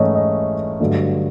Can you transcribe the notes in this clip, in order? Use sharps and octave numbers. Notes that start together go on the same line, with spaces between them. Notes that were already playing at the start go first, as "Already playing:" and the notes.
Already playing: G#2 E3 A3 C#4 C#5 D#5
D#5
G2 D3 F#3 A3